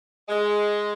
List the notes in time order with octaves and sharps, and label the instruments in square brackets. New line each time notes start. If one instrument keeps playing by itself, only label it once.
[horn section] G#3